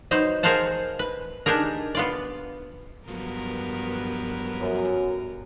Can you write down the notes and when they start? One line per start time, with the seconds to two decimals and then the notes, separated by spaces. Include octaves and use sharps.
0.11 F#3 D#4 B4 C5
0.43 G#4 A#4 C5 F5 F#5 A5
0.99 B4
1.46 D4 D#4 G4 G#4 A#4
1.95 B3 F4 D5
3.08 G2 F3 F#3 B3 A#4
4.60 F#2